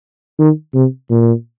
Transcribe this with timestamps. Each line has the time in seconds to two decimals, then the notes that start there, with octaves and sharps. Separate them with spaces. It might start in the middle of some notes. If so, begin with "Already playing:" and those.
0.39 D#3
0.74 C3
1.10 A#2